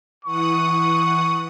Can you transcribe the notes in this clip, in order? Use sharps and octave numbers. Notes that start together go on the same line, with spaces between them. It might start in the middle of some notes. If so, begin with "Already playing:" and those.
E3 F#5 C#6 D#6